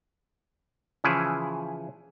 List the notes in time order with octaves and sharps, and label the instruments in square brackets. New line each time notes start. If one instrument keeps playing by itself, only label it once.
[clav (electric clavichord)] C#3 E3 F3 C#4 E4 G#4